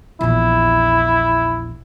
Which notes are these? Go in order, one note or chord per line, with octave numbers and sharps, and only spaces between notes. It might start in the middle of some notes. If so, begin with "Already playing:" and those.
A#1 E2 E4